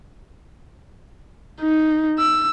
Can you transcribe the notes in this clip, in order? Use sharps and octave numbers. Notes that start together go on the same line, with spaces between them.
D#4
E6